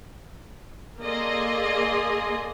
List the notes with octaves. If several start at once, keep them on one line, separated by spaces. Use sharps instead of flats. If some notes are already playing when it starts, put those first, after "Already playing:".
A#3 G#4 A4 D5 D#5 C6